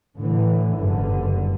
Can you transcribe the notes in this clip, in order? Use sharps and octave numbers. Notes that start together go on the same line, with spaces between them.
A2 D3 E3
F#1 G2 D3